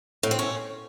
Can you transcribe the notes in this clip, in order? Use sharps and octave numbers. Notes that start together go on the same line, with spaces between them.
A2
C4
C#4